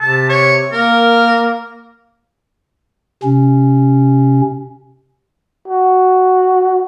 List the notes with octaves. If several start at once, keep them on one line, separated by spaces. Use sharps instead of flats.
C3 A5
C#5
A#3 A#4
C3 C#4
F#4